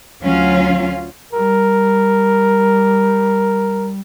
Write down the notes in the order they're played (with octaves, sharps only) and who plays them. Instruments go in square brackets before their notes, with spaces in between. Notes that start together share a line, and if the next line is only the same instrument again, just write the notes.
[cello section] D2 F#3 C#4 F4 F5
[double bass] G3 [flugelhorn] A#4